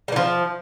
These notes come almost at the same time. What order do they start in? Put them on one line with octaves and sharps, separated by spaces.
G3 E3 F3